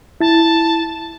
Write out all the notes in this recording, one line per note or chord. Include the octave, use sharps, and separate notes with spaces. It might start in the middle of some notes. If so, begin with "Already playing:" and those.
E4 A5 A6